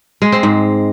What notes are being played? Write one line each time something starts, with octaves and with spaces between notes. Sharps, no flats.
G#3
C4
G#2